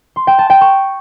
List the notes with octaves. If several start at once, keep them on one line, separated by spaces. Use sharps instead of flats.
C6
G5
A5
G5
C#6